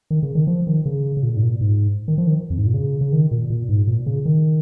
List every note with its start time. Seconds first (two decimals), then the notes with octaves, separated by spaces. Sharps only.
0.11 D#3
0.23 C#3
0.35 D#3
0.47 F3
0.67 D#3
0.86 C#3
1.17 C#3
1.23 A#2
1.36 G#2
1.42 A#2
1.61 G#2
2.08 D#3
2.18 F3
2.27 D#3
2.50 F2
2.58 G#2
2.67 A#2
2.74 C#3
3.01 C#3
3.12 D#3
3.31 A#2
3.50 A#2
3.69 G#2
3.87 A#2
4.06 C#3
4.26 D#3